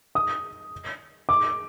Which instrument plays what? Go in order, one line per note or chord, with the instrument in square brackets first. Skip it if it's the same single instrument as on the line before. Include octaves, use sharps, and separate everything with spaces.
[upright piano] D#6
D6